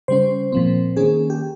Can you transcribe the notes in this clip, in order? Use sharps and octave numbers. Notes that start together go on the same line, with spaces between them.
C#3 G3 C#4 C5
A#2 F3 C4
D#3 A#3 C#4 G#4
G4